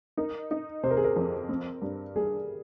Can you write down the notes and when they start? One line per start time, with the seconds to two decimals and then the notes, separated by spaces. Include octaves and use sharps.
0.17 D#4 A#4
0.51 D#4
0.83 C3 C5
0.91 A#4
0.97 G#4
1.04 A#4
1.16 F2
1.49 C4
1.82 G2
2.16 G3 G#4